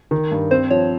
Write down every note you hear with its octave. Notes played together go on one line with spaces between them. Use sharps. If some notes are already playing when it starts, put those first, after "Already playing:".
D#3
G2
C4 C5
F3 C#5